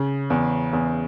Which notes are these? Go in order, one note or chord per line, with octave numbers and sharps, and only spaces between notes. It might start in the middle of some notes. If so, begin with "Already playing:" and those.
Already playing: C#3
E2
E2